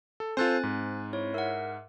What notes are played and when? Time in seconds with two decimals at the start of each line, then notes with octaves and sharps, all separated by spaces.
0.20 A4
0.37 C4 F4 A4 C5 G#5 F#6 A6
0.63 G#2
1.13 E4 C#5
1.34 A#4 E5 F#5